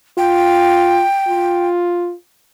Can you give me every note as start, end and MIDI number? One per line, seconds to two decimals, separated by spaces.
0.18 1.04 65
0.18 1.68 79
1.28 2.14 65